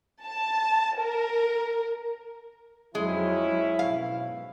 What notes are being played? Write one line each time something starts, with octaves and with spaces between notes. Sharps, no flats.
A5
A#4
F2 F#3 G#3 C#4 E4
G#2 B2 F5